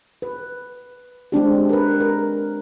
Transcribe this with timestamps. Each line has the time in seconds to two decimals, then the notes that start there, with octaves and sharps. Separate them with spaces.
0.22 B4
1.32 G#3 C4 D4 G4
1.69 A#4 B4
2.00 A#4